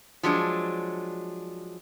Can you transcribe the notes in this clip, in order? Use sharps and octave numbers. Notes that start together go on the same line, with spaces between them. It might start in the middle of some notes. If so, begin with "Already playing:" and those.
F3 F#3 G#3 D4